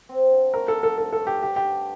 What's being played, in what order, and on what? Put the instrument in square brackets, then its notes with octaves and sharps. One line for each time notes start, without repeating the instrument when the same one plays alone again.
[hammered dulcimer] C4
D3
[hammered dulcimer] A3 [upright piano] A#4
[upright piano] A4
[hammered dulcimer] D3
[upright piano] A4
[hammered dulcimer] G2 [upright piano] A4
[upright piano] A4
[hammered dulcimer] A3
[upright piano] G4
[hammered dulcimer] G2 [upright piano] G4
[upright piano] G4
[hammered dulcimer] D3